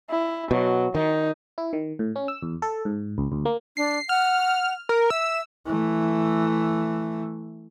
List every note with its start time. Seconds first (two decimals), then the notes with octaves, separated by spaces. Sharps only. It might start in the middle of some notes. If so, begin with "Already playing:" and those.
0.10 E4
0.51 B2 F#3
0.95 D#3 D#4
1.58 E4
1.73 D#3
1.99 A2
2.16 C#4
2.28 E6
2.42 E2
2.62 A4
2.85 G#2
3.18 C#2
3.32 D2
3.45 A#3
3.77 D4 C7
4.09 F#5 F6
4.89 A#4
5.10 E5 E6
5.66 E3 A3